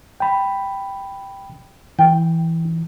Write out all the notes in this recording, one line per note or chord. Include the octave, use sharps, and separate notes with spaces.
G5 B5
E3 G5